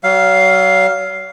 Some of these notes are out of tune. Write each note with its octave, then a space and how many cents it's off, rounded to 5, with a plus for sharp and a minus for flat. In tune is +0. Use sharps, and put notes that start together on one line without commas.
F#3 +40 F5 +0